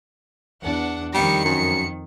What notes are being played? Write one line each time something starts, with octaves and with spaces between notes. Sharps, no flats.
E2 D4 F#5
F2 D#3 G3 C#7
F#2